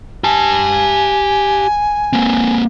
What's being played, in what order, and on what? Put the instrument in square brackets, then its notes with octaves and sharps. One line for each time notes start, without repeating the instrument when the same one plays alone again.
[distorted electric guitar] G4 A5 [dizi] G#5
[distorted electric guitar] A#3 C4